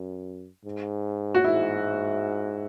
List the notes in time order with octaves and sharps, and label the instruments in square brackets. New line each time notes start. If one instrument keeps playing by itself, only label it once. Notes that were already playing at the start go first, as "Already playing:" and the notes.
Already playing: [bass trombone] F#2
G#2
[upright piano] F#4
[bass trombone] G#2 [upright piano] E4